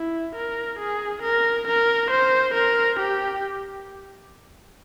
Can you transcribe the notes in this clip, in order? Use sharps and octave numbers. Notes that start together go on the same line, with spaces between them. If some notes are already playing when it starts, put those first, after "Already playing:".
Already playing: E4
A#4
G#4
A#4
A#4
C5
A#4
G4